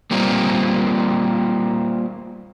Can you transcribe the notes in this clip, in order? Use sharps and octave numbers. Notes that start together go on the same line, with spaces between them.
G3 A#3 C4 F4